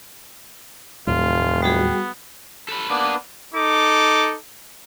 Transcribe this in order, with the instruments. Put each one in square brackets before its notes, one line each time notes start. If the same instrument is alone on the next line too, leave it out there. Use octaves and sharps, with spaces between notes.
[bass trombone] F1 [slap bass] D#2 A2 F#3 [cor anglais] F4
[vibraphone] G3 F#4 G#4 [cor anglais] B3
[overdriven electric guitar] A4 B4
[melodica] A#3 B3 D4 [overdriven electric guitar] B4 D5
[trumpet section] D#4 A4 D6